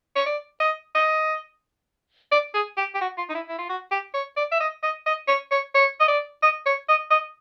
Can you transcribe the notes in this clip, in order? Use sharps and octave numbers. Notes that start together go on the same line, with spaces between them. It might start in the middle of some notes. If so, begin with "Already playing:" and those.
C#5
D5
D#5
D#5
D5
G#4
G4
G4
F#4
F4
D#4
E4
E4
F4
F#4
G4
C#5
D5
E5
D#5
D#5
D#5
C#5
C#5
C#5
D#5
D5
D#5
C#5
D#5
D#5